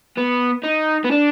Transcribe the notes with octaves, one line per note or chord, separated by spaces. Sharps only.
B3
D#4
B3
D4